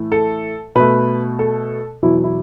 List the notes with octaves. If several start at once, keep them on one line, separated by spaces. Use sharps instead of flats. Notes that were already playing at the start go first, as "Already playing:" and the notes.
Already playing: A2 E3 A3
A4
B2 A3 B4
A4
E2 B2 F#3 E4
E4